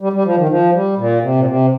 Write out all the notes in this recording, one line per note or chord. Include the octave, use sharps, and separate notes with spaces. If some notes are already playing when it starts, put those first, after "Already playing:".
G3
G3
F3
D#3
F3
G3
A#2
C3
A#2
C3